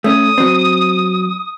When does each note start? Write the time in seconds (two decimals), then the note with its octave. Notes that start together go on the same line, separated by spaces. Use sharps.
0.04 A3 C#4 D#6
0.38 F#3 C4